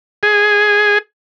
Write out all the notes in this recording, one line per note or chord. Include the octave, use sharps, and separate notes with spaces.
G#4